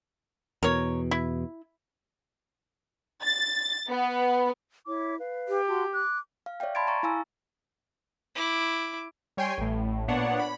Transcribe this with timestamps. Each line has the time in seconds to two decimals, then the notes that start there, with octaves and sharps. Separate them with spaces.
0.63 E2 B2 A#4 C#5
1.11 E4
3.22 A6
3.89 B3
4.86 E4 C#5 D6
5.20 B4 F5
5.49 G4
5.67 F#4 A5 C6
5.94 D6 F#6
6.46 F5
6.60 C#5 D5 E5 F5 G5
6.75 A5 B5 C6 G#6 A6 D7
6.87 A#5 C#6 A6
7.03 E4 F5 G#5 A#5 E6
8.35 E4 D6
9.37 G3 C#5 G5 G#5 C6
9.57 A1 A2
10.08 A#2 B3 D4 C#5 F#5
10.39 B5